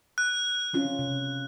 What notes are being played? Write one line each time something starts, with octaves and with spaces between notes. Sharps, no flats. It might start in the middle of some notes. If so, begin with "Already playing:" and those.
F#6
C4 C#4 F4
C3